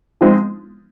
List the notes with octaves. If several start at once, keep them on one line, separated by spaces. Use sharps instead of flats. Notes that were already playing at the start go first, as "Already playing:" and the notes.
F3 G#3 C4 D#4